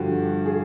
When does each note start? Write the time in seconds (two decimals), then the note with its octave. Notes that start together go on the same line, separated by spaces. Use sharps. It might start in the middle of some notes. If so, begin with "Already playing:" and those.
Already playing: G2 D3 F3 F#4 G4
0.46 G#4